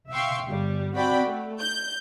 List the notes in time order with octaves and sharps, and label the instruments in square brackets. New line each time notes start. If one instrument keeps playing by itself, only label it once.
[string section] E5 F5 G5 C6 C#6
G1 G3
C4 F#4 D5 G5 B5
A3
G6